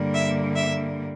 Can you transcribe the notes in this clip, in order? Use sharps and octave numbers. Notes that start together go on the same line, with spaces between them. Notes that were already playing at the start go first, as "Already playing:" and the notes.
Already playing: G2 D3 G3 A#3
E5
E5